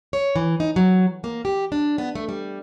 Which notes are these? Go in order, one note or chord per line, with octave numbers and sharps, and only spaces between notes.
C#5
E3
D#4
F#3
A#3
G4
D4
B3
A3
G3